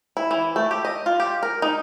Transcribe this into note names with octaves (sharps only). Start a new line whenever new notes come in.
E4
E3
A3
G4
D#5
F4
G4
A#4
D#4